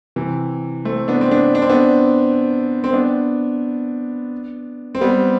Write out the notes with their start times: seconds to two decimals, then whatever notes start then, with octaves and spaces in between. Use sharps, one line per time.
0.16 C3 E3
0.85 A3 C4
1.08 B3 D4
1.21 C4
1.31 B3 D4
1.55 D4
1.62 C4
1.69 B3 D4
2.84 C4
2.93 B3 D4
4.95 C4
5.01 G3 B3